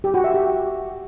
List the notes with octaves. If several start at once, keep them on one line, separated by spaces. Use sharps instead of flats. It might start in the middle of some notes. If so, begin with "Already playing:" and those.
G4
F#4
E5
G4